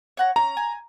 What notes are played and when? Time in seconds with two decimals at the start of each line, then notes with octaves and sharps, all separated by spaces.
0.17 C#5 F#5 A#5
0.36 C#4 A#5
0.57 G#5